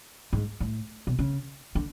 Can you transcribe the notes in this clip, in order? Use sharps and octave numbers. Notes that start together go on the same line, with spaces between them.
G#2
A2
B2
C#3
D3